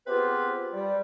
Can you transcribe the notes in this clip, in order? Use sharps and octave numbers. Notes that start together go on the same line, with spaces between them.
B3 C4 F4 G4 G#4 B4
G3